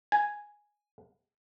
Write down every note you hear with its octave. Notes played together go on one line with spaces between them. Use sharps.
G#5